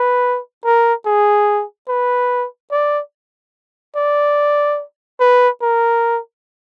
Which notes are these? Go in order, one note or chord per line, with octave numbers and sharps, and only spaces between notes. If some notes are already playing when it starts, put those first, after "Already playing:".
Already playing: B4
A#4
G#4
B4
D5
D5
B4
A#4